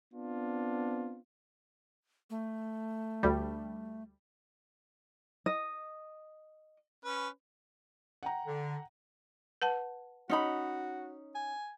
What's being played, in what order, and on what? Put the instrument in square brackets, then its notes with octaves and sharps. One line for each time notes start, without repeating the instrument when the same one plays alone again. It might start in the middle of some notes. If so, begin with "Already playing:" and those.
[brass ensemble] B3 C4 D4 F4
[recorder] A3
[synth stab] D2 G3
[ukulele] D#5
[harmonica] C#4 B4
[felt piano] F#5 G5 A#5
[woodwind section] D3
[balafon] B4 F#5 A5
[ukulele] C#4 D#4 B5 [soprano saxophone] F#4
[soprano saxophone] G#5